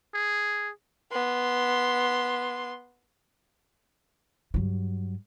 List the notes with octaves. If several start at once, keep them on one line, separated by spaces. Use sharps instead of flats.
G#4
B3 C6
G2 F#3